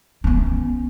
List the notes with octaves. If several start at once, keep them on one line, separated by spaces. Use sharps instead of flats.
B3 C#4